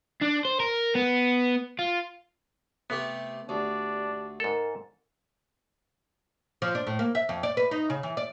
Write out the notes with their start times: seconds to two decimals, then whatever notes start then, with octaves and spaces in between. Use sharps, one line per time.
0.22 D4
0.45 C5
0.60 A#4
0.95 B3
1.79 F4
2.90 C3 A3 B3 G4
3.49 D2 D4 G4
4.40 G#2 A4 A#4
6.62 F3
6.75 D4
6.87 A2
6.99 A#3
7.15 E5
7.29 F2
7.43 D5
7.57 B4
7.71 D#4
7.90 C#3
8.03 E3
8.17 D5